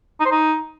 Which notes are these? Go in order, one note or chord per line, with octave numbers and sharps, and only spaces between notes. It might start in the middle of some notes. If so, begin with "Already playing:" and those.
D#4
C5
D#4